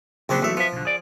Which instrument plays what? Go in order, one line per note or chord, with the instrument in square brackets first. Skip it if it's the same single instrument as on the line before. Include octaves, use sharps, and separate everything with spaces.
[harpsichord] A#1 C4 D4 [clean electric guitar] C#3 F#3
[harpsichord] B1 E5 [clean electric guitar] E3 A3
[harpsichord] F3 [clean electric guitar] B3 E5
[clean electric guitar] B1 D3
G#4 D5